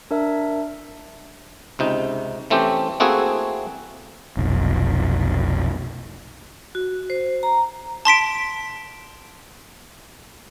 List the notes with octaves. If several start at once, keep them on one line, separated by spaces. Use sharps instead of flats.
D4 A#4 E5
C#2 C3 D#4
E3 A3 C4 C#4 G4
A3 A#3 C4 E4 F#4 G#4
F1 B1
F#4
C5
A#5
A5 C6 B6 D7